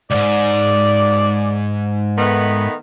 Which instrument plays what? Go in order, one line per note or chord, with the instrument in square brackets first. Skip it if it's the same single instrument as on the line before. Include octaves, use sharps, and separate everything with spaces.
[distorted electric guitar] C#2 G#2 [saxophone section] D5
[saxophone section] D#3 A3 B3